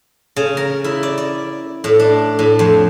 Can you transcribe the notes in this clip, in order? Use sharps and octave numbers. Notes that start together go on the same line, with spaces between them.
C#3
A#4
E4
D5
D5
A2
D4
A2
F2